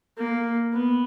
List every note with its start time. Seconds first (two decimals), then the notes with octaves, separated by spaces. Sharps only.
0.18 A#3
0.72 B3